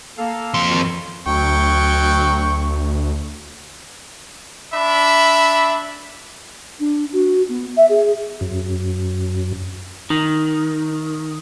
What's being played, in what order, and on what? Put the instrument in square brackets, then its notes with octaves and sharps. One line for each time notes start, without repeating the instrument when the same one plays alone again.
[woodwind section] A#3 A4 F5
[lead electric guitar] F2 C6
[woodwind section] D#3 G3 F#4
[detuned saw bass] D2 [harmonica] F#3 G5 C#6
[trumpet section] D4 E5 B5
[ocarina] D4
F#4
B3
E5
G#4
[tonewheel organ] F#2
[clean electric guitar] D#3 [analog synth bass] D#4